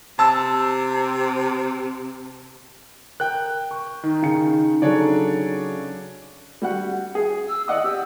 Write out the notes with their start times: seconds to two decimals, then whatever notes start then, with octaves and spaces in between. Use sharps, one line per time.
0.19 C3 A5 E6
3.20 A#4 G5 F#6
3.71 C#6
4.04 D#3 D#4
4.23 C#3 C#7
4.82 C#3 F#3 D4 A4 C#5 D5
6.62 G3 F#4 F#5
7.15 G#4
7.49 E6
7.68 D5 D#5 F#5 D#6
7.84 G4 E6